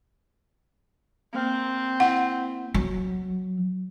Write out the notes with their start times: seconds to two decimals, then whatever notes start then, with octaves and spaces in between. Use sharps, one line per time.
1.34 A#3 C4 F6
2.00 E4 F#5
2.74 F#3